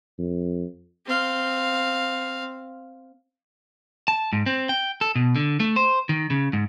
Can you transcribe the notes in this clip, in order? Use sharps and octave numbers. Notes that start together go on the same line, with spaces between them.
F2
C4 F5
A5
G#2
C4
G5
A4
B2
D3
A3
C5
D#3
C#3
G#2